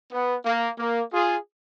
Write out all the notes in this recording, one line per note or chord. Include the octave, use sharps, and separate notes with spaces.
B3
A#3
A#3
F4 G#4